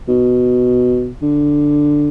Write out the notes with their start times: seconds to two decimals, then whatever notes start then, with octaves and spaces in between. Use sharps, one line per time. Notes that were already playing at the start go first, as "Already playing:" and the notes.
0.09 B2
1.22 D3